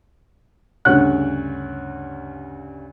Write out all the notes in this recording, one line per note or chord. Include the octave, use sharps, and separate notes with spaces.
D2 G2 C#3 C#5 F#5 F#6